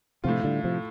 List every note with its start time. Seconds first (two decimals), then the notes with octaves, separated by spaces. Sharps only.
0.24 A2 C3 F3 A3 F4
0.44 D3 G3
0.64 C3 F3